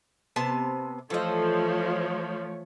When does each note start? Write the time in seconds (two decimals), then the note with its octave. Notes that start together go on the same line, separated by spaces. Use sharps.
0.36 C3 B3 A5
1.10 E3 F3 A3 A4 C#5 D#5